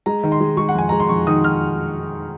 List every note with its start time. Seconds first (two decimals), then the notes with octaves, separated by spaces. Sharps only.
0.06 G#3 A#5
0.24 D#3
0.32 C6
0.41 G#3
0.57 G#3 C#6
0.69 F#5
0.75 F2 G#5
0.89 G#3 A#5
1.00 C6
1.09 F2 C#6
1.27 D#3 D#6
1.44 F6